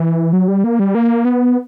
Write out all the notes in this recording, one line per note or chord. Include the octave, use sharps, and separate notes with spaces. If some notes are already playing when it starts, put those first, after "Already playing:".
Already playing: E3
F#3
G3
A#3
G3
A#3
B3